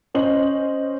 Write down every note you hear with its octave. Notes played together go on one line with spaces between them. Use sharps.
C#4 C5 D#5 F#7